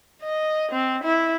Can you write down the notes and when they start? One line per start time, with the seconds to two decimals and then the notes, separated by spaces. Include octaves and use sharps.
0.23 D#5
0.72 C4
1.04 E4